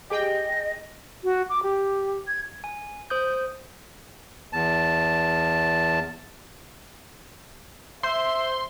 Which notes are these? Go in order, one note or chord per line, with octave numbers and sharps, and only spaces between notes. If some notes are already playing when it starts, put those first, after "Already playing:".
G4 G#4 D#5 G5
F#4
D6
G4
G#6
G#5
C5 D#6 G6
E2 A5
C5 E5 C6